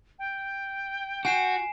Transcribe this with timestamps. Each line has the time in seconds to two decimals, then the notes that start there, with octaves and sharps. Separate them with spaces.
0.19 G5
1.25 F#4 G#5 C7 E7